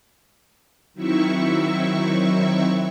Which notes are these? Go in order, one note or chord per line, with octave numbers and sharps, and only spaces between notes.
D#3 F#3 C4 E4 E5 C#6